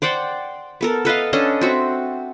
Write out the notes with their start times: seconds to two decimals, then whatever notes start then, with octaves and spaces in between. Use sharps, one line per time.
0.02 C5 D5 F#5 G5
0.81 B3 A4 A#4
1.05 A4 B4 D#5 F5
1.33 C#4 D4 A4 D#5
1.61 C4 F#4 E5